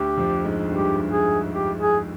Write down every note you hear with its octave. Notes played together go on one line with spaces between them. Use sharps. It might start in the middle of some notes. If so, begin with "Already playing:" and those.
Already playing: D2 D3 G4
F2 F3
G#2 G#3
G2 G3 G4
G#4
G4
G#4